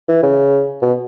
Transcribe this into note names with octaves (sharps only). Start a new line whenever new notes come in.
E3
C#3
B2